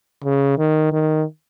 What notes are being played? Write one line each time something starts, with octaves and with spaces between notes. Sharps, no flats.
C#3
D#3
D#3